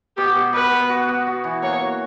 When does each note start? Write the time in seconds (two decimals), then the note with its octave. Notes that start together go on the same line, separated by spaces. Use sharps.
0.17 B2 G4
0.35 B2
0.53 B2 B4
0.72 B2
0.90 F#4
1.09 B3
1.27 F#4
1.44 E3
1.63 A#3 C#5
1.81 F#4